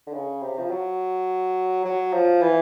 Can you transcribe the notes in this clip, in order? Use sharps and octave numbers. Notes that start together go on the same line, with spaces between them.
D3
C#3
C3
F3
F#3
F#3
F3
E3